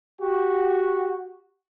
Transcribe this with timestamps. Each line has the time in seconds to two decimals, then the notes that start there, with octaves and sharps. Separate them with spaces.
0.22 F#4 G4